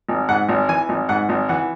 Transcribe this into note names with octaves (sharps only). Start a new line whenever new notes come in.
G#1
G#2 F#5
G#1
E3 G#5
G#1
G#2 F#5
G#1
E3 F#5